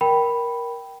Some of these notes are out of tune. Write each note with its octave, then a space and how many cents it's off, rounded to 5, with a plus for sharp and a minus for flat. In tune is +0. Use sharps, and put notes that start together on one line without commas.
A#4 +15 G5 -10 B5 +0